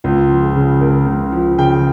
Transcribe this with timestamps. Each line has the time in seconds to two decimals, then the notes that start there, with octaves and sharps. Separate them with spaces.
0.04 C#2 F4
0.29 F3
0.42 G#4
0.55 C#3
0.81 C#2 A#4
1.06 C#2
1.32 F3
1.58 C#3 G5